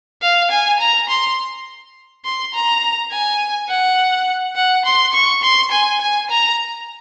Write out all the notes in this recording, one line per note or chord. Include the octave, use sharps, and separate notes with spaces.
F5
G#5
A#5
C6
C6
A#5
G#5
F#5
F#5
C6
C#6
C6
G#5
G#5
A#5